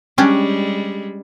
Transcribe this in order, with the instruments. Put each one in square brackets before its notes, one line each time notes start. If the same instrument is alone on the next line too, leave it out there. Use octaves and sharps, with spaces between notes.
[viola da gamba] G3 G#3 [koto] C#4 D4 G4